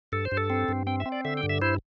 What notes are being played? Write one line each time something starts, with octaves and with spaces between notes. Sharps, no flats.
G2 A4
C5
G2
A4
C4
G2
C4 G5
E5
C4
D5
D3 E5
G5
G2
E5
E4 C5